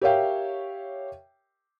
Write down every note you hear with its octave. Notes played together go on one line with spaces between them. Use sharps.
G4 A#4 C#5 E5 F5 G5